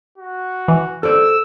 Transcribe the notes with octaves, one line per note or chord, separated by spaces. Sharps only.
F#4
E3
A4 C5 D5 E6